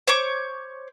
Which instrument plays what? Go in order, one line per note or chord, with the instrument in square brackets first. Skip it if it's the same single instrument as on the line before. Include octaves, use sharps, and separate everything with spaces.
[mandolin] C5 C#5 C#6 D6